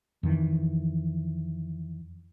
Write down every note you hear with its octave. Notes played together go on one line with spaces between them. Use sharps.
F2 D#3 E3